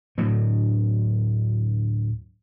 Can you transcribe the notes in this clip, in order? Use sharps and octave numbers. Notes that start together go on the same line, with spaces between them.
D2 A2 F#3